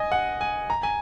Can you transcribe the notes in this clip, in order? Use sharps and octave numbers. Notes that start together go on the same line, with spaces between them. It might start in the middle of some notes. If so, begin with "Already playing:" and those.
Already playing: D#5 G#5
F#5
G#5
A#5
G#5